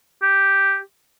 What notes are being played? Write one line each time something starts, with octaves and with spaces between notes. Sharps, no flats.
G4